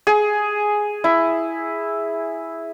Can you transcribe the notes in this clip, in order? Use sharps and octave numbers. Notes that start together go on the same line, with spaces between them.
G#4
E4